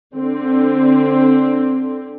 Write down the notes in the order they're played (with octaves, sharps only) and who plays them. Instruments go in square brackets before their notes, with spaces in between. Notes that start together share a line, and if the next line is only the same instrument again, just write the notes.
[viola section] D3 C4